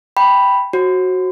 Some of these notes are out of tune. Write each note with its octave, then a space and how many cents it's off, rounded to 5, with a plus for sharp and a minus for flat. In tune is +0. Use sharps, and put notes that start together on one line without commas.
G5 +0 B5 +0
F#4 +0 C5 +40